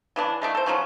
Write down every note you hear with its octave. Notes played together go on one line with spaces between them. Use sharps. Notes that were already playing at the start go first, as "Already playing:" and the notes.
C#3 E3 D4
G#3 A3 D4
A4 C5
C#3 F3 F#3 C#4